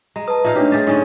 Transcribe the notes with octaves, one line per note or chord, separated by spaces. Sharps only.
G#3 A#5
B4 A5 D#6
A#2 D#4 E5 F5
A3 D4 D#4 G4 C#5
G#3 G4 G#4 A6
G#2 D3 C#4 C#5 G#5